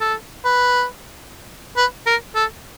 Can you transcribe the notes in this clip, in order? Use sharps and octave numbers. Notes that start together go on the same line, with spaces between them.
A4
B4
B4
A#4
A4